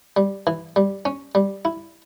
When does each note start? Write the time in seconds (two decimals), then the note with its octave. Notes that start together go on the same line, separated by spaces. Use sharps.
0.17 G3
0.47 E3
0.76 G3
1.05 C#4
1.35 G3
1.65 E4